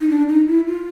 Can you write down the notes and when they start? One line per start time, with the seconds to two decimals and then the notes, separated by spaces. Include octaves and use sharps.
0.01 D#4
0.10 D4
0.29 D#4
0.47 E4
0.67 F4